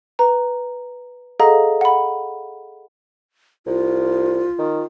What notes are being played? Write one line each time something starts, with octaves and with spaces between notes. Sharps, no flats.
B4 A#5
G#4 A4 D#5 F5 F#5 A#5
F#5 B5
C2 F4
D#3